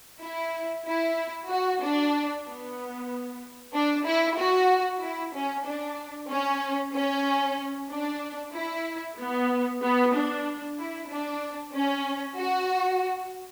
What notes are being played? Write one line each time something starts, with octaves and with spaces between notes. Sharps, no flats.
E4
E4
F#4
D4
B3
D4
E4
F#4
E4
C#4
D4
C#4
C#4
D4
E4
B3
B3
D4
E4
D4
C#4
F#4